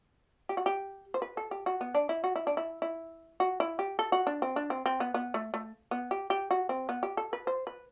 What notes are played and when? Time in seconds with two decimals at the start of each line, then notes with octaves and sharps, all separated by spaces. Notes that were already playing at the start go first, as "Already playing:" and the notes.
0.49 G4
0.57 F#4
0.66 G4
1.14 C5
1.22 B4
1.37 A4
1.51 G4
1.66 F#4
1.81 B3
1.95 D4
2.09 E4
2.24 F#4
2.36 E4
2.47 D4
2.57 E4
2.82 E4
3.40 F#4
3.60 E4
3.79 G4
3.99 A4
4.12 F#4
4.27 D4
4.42 C4
4.56 D4
4.70 C4
4.86 C4
5.00 B3
5.14 B3
5.34 A3
5.54 A3
5.91 B3
6.11 G4
6.30 G4
6.51 F#4
6.69 C4
6.89 B3
7.03 G4
7.17 A4
7.33 B4
7.47 C5
7.67 B4